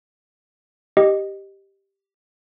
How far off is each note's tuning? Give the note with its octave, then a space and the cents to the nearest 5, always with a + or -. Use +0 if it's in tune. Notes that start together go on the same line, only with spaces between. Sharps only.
G4 +0 D#5 -10